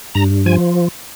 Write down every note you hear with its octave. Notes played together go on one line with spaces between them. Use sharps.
G2 A#5
F3 G#5